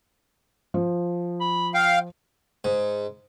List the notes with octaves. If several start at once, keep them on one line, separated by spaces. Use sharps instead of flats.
F3
B5
F5 G5
G#2